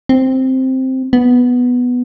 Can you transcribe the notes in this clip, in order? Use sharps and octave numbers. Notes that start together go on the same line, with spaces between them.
C4
B3